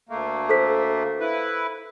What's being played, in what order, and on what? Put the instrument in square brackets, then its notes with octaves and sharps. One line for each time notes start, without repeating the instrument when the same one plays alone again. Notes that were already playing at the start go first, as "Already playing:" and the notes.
[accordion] D2 A3 A#3
[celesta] A4 C5 B6
[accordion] E4 B4